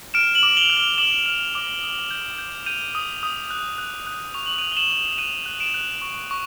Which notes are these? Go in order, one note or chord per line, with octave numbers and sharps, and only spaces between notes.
F6 D7 E7
E7 F#7
D6
F7 G7
F6
F7 G7
D6 E7 F#7
F6
D6
D#6
G6
G6
G6 D#7 F7
D#6
D#6
F#6
F#6
F#6
C#6 F7
F#7
F#6 D#7 F7
G7
E7 F#7
C#6
F#6 D#7 F7
F#6
D7 E7
F#6
C#6
C#6